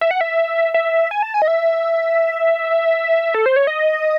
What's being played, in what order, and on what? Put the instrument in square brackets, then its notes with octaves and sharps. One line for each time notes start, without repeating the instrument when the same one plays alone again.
[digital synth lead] E5
F#5
E5
E5
G#5
A5
G#5
D#5
E5
A4
C5
C#5
D#5